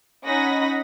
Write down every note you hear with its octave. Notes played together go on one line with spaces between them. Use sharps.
C#4 D#4 F#5 B5 D#6 A#6